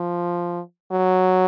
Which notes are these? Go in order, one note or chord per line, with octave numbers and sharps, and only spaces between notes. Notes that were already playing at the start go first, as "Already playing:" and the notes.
Already playing: F3
F#3